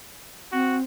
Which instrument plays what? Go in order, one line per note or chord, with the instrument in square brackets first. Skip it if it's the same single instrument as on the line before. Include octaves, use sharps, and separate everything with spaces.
[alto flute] C4 [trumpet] F#4